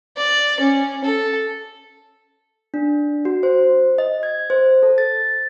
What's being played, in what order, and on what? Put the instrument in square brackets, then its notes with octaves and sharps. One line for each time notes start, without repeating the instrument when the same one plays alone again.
[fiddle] D5
C#4
A4
[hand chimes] D4
F#4
C5
D#5
G#6
C5
A4
A6